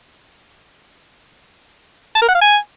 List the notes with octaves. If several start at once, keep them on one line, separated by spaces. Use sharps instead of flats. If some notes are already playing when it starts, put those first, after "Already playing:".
A5
A#4
F#5
F5
G#5